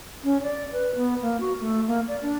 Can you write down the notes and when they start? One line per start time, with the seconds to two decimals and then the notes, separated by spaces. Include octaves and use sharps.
0.24 C#4
0.43 D5
0.72 B4
0.96 B3
1.22 A#3
1.40 F#4
1.60 A3
1.87 A#3
2.08 D5
2.22 D4